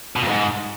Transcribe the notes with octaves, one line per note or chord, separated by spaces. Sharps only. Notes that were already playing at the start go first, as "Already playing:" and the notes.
B2
F2
G#2